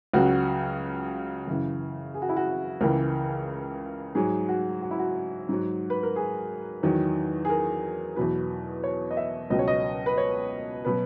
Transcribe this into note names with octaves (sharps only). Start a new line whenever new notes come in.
C#2 C#3 F#3 F#4
F#2 C#3 E3
G#4
F#4
E4
F#4
C#2 C#3 E3 A#4
G#2 F#3 G#4
F#4
F#4
E4
F#4
G#2 F#3
B4
A#4
G#4
E2 D#3 F#3
G#4
A#4
E2 B2 F#3 B4
C#5
D#5
E5
C#2 B2 F#3 D#5
C#5
D#5
B4
C#5
B2 F#3 B4